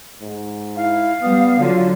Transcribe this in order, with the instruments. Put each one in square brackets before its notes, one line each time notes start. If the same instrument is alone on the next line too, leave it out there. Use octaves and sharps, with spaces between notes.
[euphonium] G#2
[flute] E4 [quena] F5
[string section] G3 [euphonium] B3 [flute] D#6
[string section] D3 [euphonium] F#3 [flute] F4